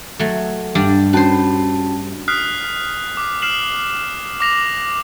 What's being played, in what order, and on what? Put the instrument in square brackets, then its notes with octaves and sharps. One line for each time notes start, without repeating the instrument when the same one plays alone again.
[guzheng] F#3 A3
G2 G3 D4
[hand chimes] C#4 F#4 A5 [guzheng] B4 C5
[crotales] D#6 F6 F#6 B6 C7
D6
F6 C7 E7 F#7
D6 A#6 F7